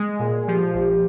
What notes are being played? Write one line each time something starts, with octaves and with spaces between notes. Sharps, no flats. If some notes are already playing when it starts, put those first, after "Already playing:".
Already playing: G#3
A#2 G#4
F3 G4
A#1 G4